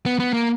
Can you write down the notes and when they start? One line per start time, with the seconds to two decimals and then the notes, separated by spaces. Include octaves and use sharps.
0.06 B3
0.20 B3
0.33 A#3